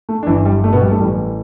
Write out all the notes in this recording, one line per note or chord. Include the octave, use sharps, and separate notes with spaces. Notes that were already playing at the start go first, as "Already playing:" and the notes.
A3
D4
G1 G2 D3 E3 E4
G3
A3
B2 B3
G3
A3
A1 A2 E3 G3